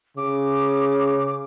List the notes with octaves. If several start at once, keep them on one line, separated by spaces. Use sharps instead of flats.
C#3 D6